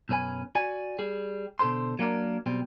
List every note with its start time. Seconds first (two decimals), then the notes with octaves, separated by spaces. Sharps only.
0.09 B1 F#2 C#4 B4 G#5
0.55 F#4 D5 G#5
0.99 G3 G#4
1.59 B2 D3 A4 C5 C6
1.99 F#3 A#3 D4 F4 A#4 D5
2.46 B1 B2 G3 C4